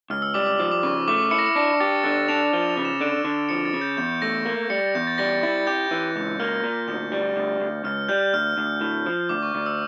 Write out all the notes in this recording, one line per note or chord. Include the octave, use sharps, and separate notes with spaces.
C#2 F6
E6
G3 D6
D6
F3
D6
C#3 C#6
A3 D6
E4 C#7
A#6
C#7
D4 A#6
G4 A6
D3 A6
D4 F7
F3 G7
F7
C#3
E7
D3 D7
D3
F3 C#7
A6
C#3
G6
E2 G6
A3 A#6
A#3
G3 C#7
E2 G6
A6
G3 A#6
E4 A6
G4 G6
E3
C#2 A6
A#3 F6
A#2
D2 G6
G3
D2
D2
C#2 F6
G3 G6
D2 F6
D2
A2
F3
D2 D6
C#6
D2
E6